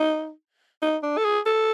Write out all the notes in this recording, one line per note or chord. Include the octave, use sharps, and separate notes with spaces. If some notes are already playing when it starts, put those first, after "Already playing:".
Already playing: D#4
D#4
D4
A4
G#4
A4